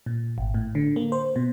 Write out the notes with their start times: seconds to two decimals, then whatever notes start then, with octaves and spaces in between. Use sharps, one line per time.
0.06 A#2
0.38 G#1
0.54 A2
0.75 D3
0.96 A#3
1.12 C5
1.36 B2